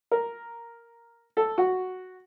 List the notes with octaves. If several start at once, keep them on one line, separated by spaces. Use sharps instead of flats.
A#4
A4
F#4